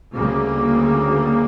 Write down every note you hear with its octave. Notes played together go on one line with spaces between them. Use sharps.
D2 C#3 G3 A#3